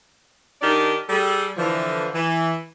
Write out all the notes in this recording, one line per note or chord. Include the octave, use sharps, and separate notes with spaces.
D#3 D4 D#4 G4 A#4 D5
G3 G#4 A4
D3 E3 F3
E3